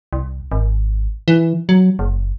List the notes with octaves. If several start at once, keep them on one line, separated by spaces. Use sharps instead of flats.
C2
G#1
E3
F#3
F#1